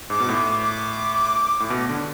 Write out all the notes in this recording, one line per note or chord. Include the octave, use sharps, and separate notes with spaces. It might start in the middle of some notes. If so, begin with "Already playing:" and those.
G#2 D6
B2
A2
D6
A2
B2
D3